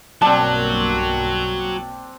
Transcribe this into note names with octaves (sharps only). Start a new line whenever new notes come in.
B1 G2 F#3 A#3 C4 D4 A5